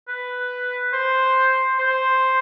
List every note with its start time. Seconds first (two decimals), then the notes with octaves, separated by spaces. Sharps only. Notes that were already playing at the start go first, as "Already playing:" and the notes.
0.08 B4
0.93 C5
1.79 C5